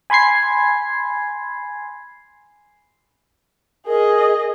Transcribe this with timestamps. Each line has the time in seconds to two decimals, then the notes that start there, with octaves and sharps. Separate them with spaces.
0.10 G#5 B5 C6 G#6 C7
3.87 G#4 A#4 D#5